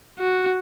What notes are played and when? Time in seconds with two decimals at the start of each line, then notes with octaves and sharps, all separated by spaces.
0.19 F#4